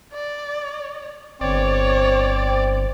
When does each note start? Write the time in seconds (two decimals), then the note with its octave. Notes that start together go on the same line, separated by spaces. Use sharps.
0.13 D5
1.41 G1 C4 C#5 D5